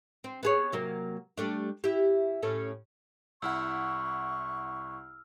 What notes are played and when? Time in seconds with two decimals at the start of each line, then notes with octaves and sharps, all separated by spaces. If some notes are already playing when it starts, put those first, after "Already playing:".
0.24 C4
0.43 B3 G#4 C#5
0.72 C3 F#3 A#3
1.37 G3 A3 D4
1.84 E4 G4
2.43 A2 C#4 A4
3.42 C2 E4 F#5 C#6 E6 F6